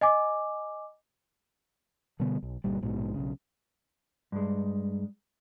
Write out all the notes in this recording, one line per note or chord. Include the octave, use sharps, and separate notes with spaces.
D#5 G#5 D6
B2 D3 G3 B3
B1
G1 A#2 G3
A#1 G#2 B2
B1 C#3
G2 G#3